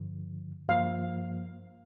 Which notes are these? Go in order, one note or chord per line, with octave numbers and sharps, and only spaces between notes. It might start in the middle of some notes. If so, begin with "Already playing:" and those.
Already playing: G2 D3 F3
G2 F3 A#3 F5